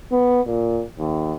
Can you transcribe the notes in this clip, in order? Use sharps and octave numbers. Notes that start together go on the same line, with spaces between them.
B3
A#2
D#2